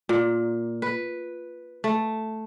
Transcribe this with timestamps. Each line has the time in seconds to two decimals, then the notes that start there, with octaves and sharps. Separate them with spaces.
0.09 A#2
0.82 B4
1.84 A3